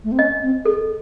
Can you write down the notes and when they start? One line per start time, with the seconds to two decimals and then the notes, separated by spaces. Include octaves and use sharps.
0.04 A3
0.12 C4
0.19 C#4 D#5
0.43 C4
0.65 G#4 A4